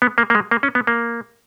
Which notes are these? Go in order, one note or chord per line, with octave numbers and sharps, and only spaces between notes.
B3
A#3
A#3
G#3
A#3
C#4
B3
A#3